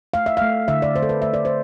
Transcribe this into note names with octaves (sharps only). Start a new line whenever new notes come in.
A3 F5
E5
A3 F5
D3 E5
D5
D3 C5
A4
B4
A3 E5
D5
C5